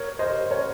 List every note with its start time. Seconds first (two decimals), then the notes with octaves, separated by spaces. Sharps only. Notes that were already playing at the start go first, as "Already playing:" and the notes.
Already playing: A#4 C#5
0.19 C5 D#5
0.51 A#4 C#5